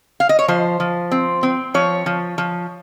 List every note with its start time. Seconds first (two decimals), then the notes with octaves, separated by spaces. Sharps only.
0.20 F5
0.29 D#5
0.39 C#5
0.48 F3 C5
0.80 F3
1.11 C4
1.43 C4
1.74 F3 C#5
2.06 F3
2.38 F3